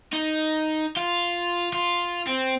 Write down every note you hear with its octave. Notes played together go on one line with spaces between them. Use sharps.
D#4
F4
F4
C4